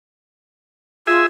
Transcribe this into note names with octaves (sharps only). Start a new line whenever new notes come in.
F4 G#4 E5